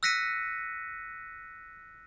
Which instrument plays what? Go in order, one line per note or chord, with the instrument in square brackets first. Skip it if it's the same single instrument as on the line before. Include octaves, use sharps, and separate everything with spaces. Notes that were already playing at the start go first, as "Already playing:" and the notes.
[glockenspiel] E6 F#6 A#6 B6 C#7 D#7